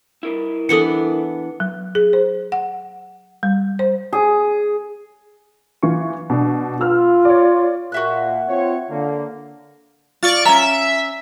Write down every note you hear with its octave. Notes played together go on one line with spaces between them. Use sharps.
E4 A#4 B4
E3 B3 D4 A4 C#7
F#3
G#4
C5
F#5
G3
C5
G#4
E3 F4 C#6
B2 D4
F4 B4 E6 F6
C#5 D5
A#2 A#3 F#4 E5 F#6
C4 F4 C#5
D3 A#3
F4 D5 C#6 A6
C#4 E5 A#5